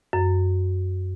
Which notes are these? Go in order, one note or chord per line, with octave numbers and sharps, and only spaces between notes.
F#2